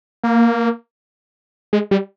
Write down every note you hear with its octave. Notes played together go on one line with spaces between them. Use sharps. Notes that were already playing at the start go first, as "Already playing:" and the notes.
A#3
G#3
G3